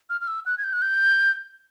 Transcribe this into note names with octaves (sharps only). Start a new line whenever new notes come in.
F6
F6
E6
F#6
G#6
G6
F#6
G6